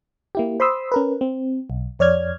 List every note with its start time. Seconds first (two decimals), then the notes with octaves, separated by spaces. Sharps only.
0.35 A#3 E4 G4
0.60 C5 B5 C6 D#6 E6
0.92 C#4 A#4 B4
1.21 C4
1.70 B1
1.99 F2 C#5 D5 F6 G#6